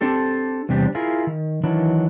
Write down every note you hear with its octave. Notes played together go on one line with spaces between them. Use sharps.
C4 D4 G4 A4
E2 C3 G3 D4 G4
E4 F4 G#4 A#4
D#3
D#3 E3 F#3 D4 E4